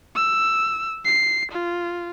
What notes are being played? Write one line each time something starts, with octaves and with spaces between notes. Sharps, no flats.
E6
C7
F4